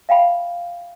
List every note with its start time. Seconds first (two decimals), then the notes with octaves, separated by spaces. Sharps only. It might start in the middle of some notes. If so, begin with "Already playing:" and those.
0.09 E5 F5 G5 B5